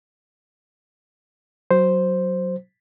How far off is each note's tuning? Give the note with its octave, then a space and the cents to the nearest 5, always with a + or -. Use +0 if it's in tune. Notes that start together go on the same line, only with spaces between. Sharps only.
F#3 +5 C5 +0